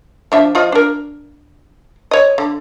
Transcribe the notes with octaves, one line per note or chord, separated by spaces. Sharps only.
F3 D4 E5
F3 F4 D#5
D4 A#4
C#5 D#5
D3